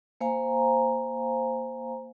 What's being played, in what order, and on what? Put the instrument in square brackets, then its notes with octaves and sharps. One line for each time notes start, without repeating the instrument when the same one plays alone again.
[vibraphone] A#3 C5 F5 G#5 A#5